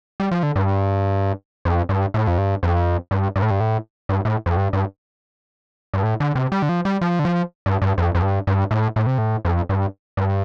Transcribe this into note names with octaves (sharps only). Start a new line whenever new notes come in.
G3
F3
D3
G2
F2
G2
A2
F2
G2
F2
G2
G2
A2
G2
A2
G2
A2
F2
G2
G2
G2
A2
D3
C3
G3
D3
F3
G3
F3
D3
F3
G2
G2
F2
F2
G2
G2
A2
A2
C3
A2
F2
G2
G2